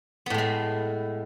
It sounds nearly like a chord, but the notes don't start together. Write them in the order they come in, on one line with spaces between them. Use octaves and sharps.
B3 A2 G#3 A3